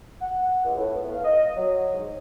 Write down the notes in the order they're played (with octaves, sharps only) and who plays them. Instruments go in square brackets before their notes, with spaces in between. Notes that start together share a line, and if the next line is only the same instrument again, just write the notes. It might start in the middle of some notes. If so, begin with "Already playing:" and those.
[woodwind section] F#5
C#2
A2
B3
F5
D#5
F#3
G#2